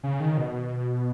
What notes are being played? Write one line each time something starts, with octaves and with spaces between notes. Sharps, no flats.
C#3
D#3
B2